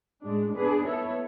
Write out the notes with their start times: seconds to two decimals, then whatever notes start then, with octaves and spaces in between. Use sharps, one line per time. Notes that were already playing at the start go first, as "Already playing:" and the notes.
0.23 A2 G#3 D4
0.55 B3 D4 G#4 B4
0.86 B3 E4 A4 C#5